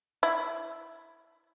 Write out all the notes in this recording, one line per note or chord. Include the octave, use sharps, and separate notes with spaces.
E4